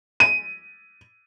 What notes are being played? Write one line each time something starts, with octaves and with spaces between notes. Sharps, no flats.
D#7